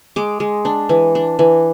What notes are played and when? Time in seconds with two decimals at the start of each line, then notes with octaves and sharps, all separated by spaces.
0.16 G#3 D6
0.40 G#3
0.65 D4
0.89 E3
1.15 D4
1.39 E3